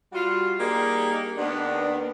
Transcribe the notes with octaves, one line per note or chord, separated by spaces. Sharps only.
G3 F4 F#4
G3 A#3 D4 D#4 G4 G#4
D#2 B3 D4